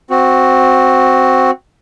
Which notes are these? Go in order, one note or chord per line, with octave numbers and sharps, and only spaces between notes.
C4 F#4